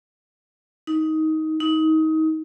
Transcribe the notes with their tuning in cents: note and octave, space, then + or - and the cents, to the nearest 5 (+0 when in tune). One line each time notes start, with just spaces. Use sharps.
D#4 +15
D#4 +25